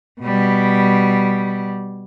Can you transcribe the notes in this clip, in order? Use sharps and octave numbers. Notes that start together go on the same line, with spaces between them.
B2 G3